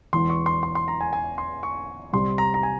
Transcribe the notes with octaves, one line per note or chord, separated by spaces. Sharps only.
E1 E2 E3 C6
C#6
C6
C6
C6
A#5
G#5
G#5
C6
C#6
C2 C3 G3 C6
A#5
A#5
G#5